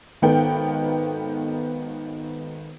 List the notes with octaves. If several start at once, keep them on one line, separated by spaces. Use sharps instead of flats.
G#1 D#3 B3 A4 G5